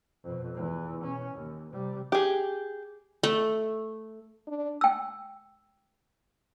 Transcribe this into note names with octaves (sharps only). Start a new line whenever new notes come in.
F2 B2
E2 E3
B2 C#4
D#2
C3 G3
G4 G#4
A3
D4
G5 E6